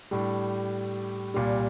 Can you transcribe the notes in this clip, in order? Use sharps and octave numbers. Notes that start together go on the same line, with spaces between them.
A2 G3 D4
C2 A#2 G3